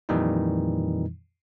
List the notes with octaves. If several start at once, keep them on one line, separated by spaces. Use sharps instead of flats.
F2 A#2 D#3 E3 G3 D#4